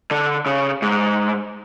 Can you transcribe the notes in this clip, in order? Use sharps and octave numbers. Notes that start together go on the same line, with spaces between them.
D3
C#3
G#2